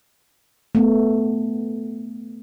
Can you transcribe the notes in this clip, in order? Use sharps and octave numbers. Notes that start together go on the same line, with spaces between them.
A3 B3